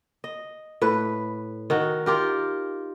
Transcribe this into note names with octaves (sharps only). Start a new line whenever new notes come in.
D#5
A2 B4
D#3 D#4 F#4
F4 G4 A#4